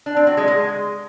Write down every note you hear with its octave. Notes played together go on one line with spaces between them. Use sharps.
D4
C4
F#3
G#3
G#3